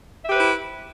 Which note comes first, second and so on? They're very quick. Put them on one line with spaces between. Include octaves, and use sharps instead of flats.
E5 G4 B4 C5 E4